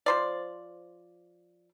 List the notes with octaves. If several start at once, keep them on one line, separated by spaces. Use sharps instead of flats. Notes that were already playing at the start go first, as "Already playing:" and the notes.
F3 C5 D5